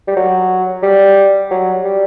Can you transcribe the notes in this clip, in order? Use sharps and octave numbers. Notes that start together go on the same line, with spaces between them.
G3
F#3
G3
F#3
G3